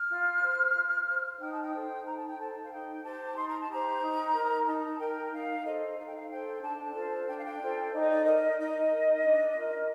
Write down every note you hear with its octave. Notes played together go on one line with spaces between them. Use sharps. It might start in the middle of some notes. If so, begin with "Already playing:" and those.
Already playing: F6
F4
C5
F4
C5
D#4 G5
A5
G5
A4 C5
D#4 A#5
A5
G5
A4 C5 A5
F5
D#4 G5
G4 C5 A5
D#4 C6
A#5
A5
G4 C5 A#5
D#4
A#4
D#4 A5
A#4 G5
D#4 F5
A4 C5 D#5
D#4 F5
G5
F5
A4 C5 G5
D4 A5
F4 A4 C5
D4 G5
F5
G5
F4 A4 C5
D#4 D5
D#5
D5
A#4 D#5
D#4 D#5
A#4
D4
F4 A#4